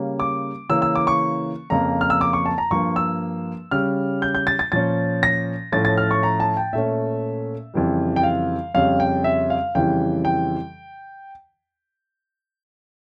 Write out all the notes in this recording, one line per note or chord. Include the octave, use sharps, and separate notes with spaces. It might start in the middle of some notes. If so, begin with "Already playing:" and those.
Already playing: C#3 G3 A#3 C#4
D6
C#3 E3 A#3 C#4 E6
E6
D6
C#6
F2 C#3 F3 A#3 A#5
F6
E6
D6
C#6
A5
A#5
G2 F3 A#3 C#6
E6
C#3 G3 C#4 F6
G6
G6
A6
A6
A#2 F3 C#4 A6
A#6
A2 F3 A3 C#4 A6
A6
F6
C#6
A#5
A5
G5
A#2 A3 C#4 E5
F2 C#3 E3 G3
G5
F5
F2 C#3 G3 C#4 F5
G5
E5
F5
F2 C#3 E3 G3 G5
G5